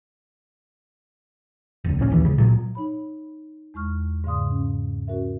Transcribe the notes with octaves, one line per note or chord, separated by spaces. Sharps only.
F1 C#2
D1 A#1 A#2 C#4
A#1 D#2 D3 E3
C#2 C#3
A#2 F#3
D#4 C#5 B5
E2 G#3 C#6 F6
G#2 C#3 D5 F5 C6 D#6
C#4
C#4 F#4 A#4 E5